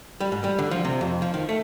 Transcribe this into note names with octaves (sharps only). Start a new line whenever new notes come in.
G3
G#2
G3
D3
F3
C3
F2
F3
D#3
A3